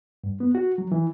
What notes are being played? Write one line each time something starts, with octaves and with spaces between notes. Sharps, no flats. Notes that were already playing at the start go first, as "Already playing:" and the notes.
G2
B3
F#4
F#3
E3